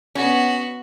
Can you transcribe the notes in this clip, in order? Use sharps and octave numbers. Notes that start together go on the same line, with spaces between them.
B3 C#4 F#4